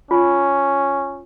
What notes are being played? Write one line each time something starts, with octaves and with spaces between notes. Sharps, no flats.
C#4 F4